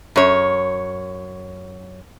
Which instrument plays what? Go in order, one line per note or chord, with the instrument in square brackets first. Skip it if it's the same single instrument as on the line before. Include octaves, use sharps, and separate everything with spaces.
[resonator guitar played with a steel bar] F#2 C#5